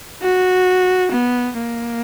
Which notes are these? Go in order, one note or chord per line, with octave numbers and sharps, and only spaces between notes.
F#4
B3
A#3